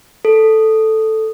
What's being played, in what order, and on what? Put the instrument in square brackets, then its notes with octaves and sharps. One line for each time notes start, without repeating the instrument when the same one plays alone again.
[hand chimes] A4